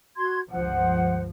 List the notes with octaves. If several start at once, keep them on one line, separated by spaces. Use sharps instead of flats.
F#4 C6 G#6
G1 C#2 F3 C5 F#5